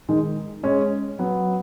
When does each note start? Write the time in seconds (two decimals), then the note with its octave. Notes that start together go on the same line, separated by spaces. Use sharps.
0.09 D#3 G#3
0.63 G#3 C#4
1.19 F#3 B3